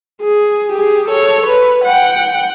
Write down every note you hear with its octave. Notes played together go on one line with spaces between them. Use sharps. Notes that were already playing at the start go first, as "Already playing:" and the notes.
G#4
G4 G#4
A4 C#5
B4
F#5 G5